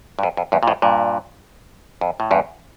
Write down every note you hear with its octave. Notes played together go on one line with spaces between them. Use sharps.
G2
F2
F2
E2 G2
A#2
F2 A2
G2 A#2
F2
A2
E2 G2